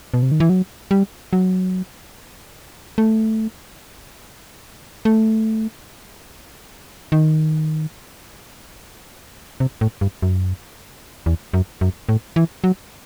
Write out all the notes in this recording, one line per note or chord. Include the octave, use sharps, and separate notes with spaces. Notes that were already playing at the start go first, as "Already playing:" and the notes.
B2
C3
D#3
E3
F#3
G3
F#3
A3
A3
D#3
C3
A2
G2
F#2
E2
F#2
F#2
A2
E3
F#3